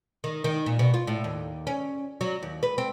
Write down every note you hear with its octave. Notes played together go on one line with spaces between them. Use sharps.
D#3
D#3
A#2
B2
F4
A2
D#2
C#4
F#3
D#2
B4
C4